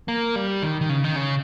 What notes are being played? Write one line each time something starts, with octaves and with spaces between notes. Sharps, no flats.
A#3
G3
D#3
D#3
C#3
D#3
C#3